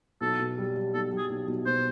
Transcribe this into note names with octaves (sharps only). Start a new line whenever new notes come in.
B1 A4
B2
G3
G3
B1 A4
G3
G#4
B1
B1
B2 C5